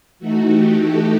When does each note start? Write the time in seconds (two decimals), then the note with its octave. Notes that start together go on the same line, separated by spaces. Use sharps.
0.19 E3 A3 D#4 F#4
0.49 G4
0.80 A4